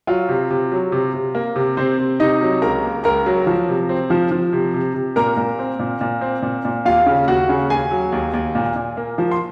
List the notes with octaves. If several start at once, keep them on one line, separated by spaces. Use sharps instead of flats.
F#3 F4
C3
C3
F#3
C3
C3
A#3
C3
C3 C4 C5
C3
C3 D#4 D#5
F#3
C#2 A#4 A#5
A#3
C#2 A#4 A#5
F#3
F3
C3
C4
F3
F3
C3
C3
C3
A#2 A#4 A#5
A#2
C4
A#2
A#2
C4
A#2
A#2
D#2 F4 F5
C#3
D#2 F#4 F#5
C#3
D#2 G#4 G#5
F#3
D#2
D#2
A#2
A#2
A#3
F3
C6